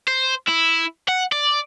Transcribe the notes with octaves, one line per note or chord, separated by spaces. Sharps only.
C5
E4
F#5
D5